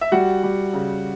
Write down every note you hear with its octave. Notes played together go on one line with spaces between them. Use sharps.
E5
G3 F#4 F#5
G3
C#3